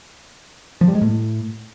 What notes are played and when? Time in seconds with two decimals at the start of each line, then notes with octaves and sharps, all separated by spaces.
0.81 F3
0.88 G3
0.95 G#3
1.02 A2